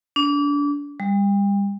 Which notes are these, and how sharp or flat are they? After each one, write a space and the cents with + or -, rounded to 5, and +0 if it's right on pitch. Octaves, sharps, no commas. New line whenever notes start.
D4 -30
G3 +35